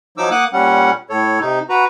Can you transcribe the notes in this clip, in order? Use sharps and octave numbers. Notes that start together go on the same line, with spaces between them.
F3 F#3 D#4 D6 E6
A#3 F#5 D6 D#6 F#6
A#2 G3 C#4 F#5
A2 A4 C#5
C3 D#4
F#4 B4 A#5